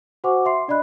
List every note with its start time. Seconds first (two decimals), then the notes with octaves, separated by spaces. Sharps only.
0.24 F#4 C5 F#5 G#5 C#6 D6
0.45 E5 C6 C7
0.68 D4 D5 D#5 B5 F#6